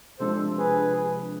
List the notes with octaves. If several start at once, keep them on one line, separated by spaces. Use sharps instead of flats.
C3 F3 G#3 D4 A4 C5
G#4 B4